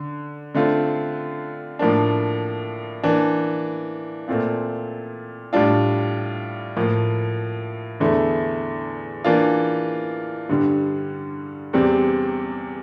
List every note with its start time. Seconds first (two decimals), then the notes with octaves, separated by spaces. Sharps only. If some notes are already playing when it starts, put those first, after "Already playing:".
Already playing: D3
0.55 D3 A3 C4 F4
1.79 A2 F3 A#3 D4
3.03 E3 A#3 D4
4.28 A#2 A3 C4 F4
5.53 A2 G3 D4 F4
6.76 A2 F3 A#3
8.00 E2 D3 A3 E4
9.24 E3 A#3 D4 F4
10.49 G2 D3 G3
11.73 E2 C3 G3 C4